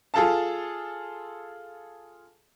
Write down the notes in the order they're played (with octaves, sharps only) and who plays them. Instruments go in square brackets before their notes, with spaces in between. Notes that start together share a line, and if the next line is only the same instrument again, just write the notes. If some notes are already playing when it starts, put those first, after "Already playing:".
[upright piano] F4 G#4 A4 F5 A5